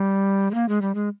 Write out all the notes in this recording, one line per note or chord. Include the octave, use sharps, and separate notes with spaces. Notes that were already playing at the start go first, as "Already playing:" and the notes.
Already playing: G3
G#3
A#3
G#3
G3
G#3